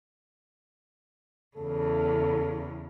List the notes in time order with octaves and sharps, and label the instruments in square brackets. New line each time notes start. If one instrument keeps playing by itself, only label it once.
[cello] E2 C#3 [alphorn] A4